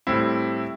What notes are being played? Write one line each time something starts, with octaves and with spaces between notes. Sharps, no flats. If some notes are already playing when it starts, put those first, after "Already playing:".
A2 G3 C4 E4